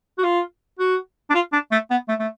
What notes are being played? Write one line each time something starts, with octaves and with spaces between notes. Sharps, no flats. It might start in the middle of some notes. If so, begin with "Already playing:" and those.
F#4
F4
F#4
D4
F4
D4
A3
B3
A3
A3